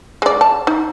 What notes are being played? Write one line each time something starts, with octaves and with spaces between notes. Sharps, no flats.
G#3 D5
A5
D#4